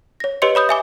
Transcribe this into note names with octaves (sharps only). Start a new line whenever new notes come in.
C#5 A#6
G4 B4 C#5 D#5 C6 C#7
C#5 B5 D#6 G6
E5 G#5 D6